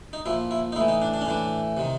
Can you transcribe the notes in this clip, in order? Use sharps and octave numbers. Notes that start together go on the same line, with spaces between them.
D#4
A#2 F3 E4
E4
D#4
A2 E3 E4
D#4
D4
D4
C#4
A2 E3 D4
C3 D#3